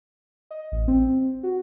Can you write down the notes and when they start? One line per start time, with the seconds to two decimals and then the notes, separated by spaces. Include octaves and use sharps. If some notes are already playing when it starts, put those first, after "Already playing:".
0.51 D#5
0.72 A1
0.88 C4
1.43 F#4